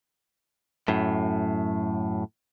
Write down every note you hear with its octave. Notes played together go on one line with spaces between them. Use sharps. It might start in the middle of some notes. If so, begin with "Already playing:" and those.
F#2 A2